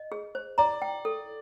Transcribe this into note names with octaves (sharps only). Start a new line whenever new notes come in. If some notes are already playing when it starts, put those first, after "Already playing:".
Already playing: D#5
G#4
C5
D5 A#5
G5
A4